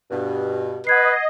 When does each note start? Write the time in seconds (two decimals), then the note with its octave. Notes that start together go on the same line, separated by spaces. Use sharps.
0.10 G2 B2
0.87 B4 D#5 F#5 G#6 C7